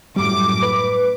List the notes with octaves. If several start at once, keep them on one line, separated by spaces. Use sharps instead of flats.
F#2 A2 G3 D6
B4